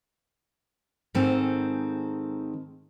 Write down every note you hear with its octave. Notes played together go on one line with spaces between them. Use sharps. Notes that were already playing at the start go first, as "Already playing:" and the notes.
G#2 D#3 G#3 C4 A4